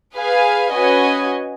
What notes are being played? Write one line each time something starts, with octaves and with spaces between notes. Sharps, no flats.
G#4 B4 F5 G#5
C#4 F#4 B4 D#5 G#5